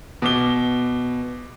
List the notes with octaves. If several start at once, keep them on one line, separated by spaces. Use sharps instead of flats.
B2 D6 G7